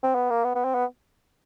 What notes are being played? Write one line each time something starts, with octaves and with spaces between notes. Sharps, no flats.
C4
B3
A#3
B3
B3
C4
B3